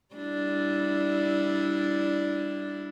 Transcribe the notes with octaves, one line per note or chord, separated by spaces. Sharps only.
G3 D4 E4